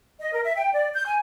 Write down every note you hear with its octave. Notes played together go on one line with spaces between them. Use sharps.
D#5
A#4
E5
G5
D5
G6
G#5